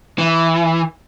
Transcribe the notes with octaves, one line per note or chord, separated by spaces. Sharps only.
E3